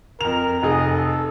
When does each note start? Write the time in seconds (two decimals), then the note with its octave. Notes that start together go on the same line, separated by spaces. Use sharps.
0.21 F2 A#4 F7
0.63 F1 G#4 D#5
0.93 A4